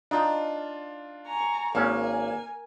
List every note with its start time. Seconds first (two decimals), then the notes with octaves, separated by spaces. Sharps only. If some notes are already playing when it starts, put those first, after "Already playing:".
0.11 D4 D#4 F4
1.26 G#5 A#5 C#6
1.75 G#1 A#3 C#4 A#4 G#5